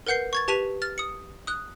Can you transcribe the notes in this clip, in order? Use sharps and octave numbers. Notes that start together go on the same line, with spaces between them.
A#4 B4 F#5 G6 C7
C#6 G#6 A6
G4 B4 A5 B6 D#7 F7
F6 A6
D#6 C#7
D#6 F#6